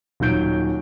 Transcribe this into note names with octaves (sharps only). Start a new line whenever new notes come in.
D#1 D#3 F#3 G6 D7